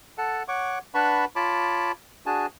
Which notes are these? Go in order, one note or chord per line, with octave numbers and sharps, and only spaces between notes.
A4 F#5 A5
C#5 F#5 C#6 D6
D4 B4 F#5 A5 B5 C#6
F4 C#5 A5 B5 D6
D4 F#4 G#4 G#5 A5